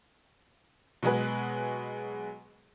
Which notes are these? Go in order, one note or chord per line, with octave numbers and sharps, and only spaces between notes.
B2 F#3 G#3 G#4 B4